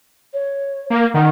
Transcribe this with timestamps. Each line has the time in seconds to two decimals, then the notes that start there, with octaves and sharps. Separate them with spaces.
0.33 C#5
0.90 A#3
1.14 D#3 F#5